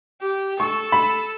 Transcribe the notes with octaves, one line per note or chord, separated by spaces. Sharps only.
G4
A4 C#6
B5